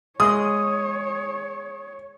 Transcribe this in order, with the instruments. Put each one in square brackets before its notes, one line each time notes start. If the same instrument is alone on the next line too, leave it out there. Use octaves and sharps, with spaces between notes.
[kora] G#3 G#4 D#5 [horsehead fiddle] C#5 [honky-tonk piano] D#6